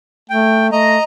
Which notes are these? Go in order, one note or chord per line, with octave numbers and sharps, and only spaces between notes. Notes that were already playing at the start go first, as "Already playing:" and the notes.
A3 G5
A3 D#5 A#5